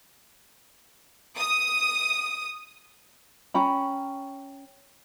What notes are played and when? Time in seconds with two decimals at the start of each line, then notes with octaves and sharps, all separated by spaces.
1.37 D#6
3.54 C#4 G5 A#5 B5